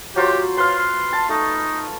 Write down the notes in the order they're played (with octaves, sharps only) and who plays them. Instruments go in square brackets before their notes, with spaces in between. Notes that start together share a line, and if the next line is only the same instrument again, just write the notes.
[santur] F#3 F4 C5 [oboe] G4
[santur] B4 F5 [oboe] C6
[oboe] C6
[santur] A5
[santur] A3 [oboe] D#4